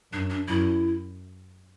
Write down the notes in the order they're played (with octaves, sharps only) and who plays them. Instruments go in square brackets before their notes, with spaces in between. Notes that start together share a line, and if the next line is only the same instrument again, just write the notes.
[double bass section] F#2 [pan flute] D4
[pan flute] D4
[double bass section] F#2 [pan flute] E4